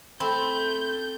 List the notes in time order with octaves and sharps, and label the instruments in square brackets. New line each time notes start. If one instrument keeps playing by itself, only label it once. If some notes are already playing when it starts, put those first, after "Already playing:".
[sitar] A3 [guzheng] C4 [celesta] B5 [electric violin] G6